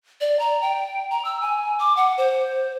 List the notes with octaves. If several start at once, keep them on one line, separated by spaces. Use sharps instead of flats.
D5
A#5
G5
A#5
E6
G#5
D6
F#5
C5